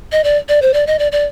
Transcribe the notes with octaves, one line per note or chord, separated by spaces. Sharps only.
D#5
D5
D5
C5
D5
D#5
D5
D5